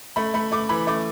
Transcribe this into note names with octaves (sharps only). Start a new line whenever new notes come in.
A3 B5
A3 B5
A3 D6
E3 B5
A3 D6